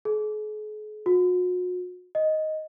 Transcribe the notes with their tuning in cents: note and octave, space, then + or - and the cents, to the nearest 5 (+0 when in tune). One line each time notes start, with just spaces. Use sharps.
G#4 +45
F#4 -40
D#5 +5